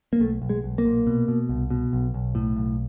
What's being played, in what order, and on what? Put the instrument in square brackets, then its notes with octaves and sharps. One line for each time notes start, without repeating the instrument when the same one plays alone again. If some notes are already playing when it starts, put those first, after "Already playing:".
[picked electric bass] A#3
B1 A3
B1
G#3
B1
A#3
A#2
B2
B2
C2
B2
B1
B1
A2
B1